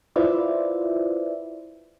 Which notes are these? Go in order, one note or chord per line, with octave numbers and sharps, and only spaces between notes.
E4 F4 B4 C5 D5 E5